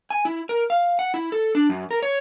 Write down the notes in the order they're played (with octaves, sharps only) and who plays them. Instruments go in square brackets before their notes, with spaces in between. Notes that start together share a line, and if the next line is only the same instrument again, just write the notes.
[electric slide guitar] G#5
E4
A#4
F5
F#5
E4
A4
D4
F#2
A#4
C#5